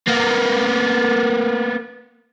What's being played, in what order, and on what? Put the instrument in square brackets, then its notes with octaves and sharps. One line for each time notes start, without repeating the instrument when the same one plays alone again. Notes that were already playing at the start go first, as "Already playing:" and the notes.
[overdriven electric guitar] A#3 B3